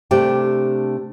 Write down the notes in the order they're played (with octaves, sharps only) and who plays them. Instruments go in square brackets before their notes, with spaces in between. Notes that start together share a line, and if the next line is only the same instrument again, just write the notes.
[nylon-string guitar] C3 A3 D4 G4 G5